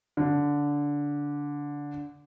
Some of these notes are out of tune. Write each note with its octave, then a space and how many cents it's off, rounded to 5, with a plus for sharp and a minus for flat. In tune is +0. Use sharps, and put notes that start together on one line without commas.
D3 -15